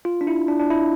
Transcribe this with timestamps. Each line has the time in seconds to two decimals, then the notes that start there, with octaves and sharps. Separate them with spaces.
0.05 F4
0.21 D4
0.27 E4
0.48 D4
0.60 D4
0.70 E4